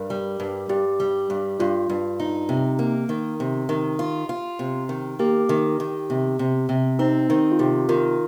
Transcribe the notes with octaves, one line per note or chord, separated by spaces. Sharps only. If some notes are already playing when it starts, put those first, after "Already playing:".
Already playing: G2 A#4
G3
G2
G2 G4
G3
G2
G2 F4
G2
D#4
C3
A#3
D#3
C3
D#3
F4
F4
C3
D#3
A#3 G4
D#3
D#3
C3
C3
C3
C4 D#4
D#3 D#4
F4
C3 G4
D#3 F4 A#4